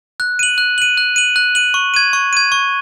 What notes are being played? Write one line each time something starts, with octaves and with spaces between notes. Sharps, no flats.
F#6
D#7 F#7
F#6
D#7 F#7
F#6
D#7 F#7
F#6
D#7 F#7
C#6
G#6 D#7
C#6
G#6 D#7
C#6